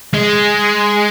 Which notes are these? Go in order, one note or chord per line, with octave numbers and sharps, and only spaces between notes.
G#3